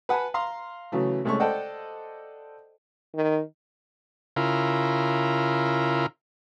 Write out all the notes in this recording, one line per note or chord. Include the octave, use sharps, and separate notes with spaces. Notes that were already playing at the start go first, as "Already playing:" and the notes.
B4 F#5 G#5 A5 B5
F5 A#5 C6
C#3 E3 F#3 A3
C2 G#3 A3 C#4 C#6
A4 C5 D5 D#5 F#5 G5
D#3
C#3 E4 F4 A#4